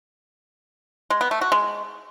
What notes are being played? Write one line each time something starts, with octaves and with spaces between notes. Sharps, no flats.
G#3
B3
A3
F#4
G#3